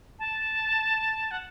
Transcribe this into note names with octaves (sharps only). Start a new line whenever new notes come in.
A5
F#5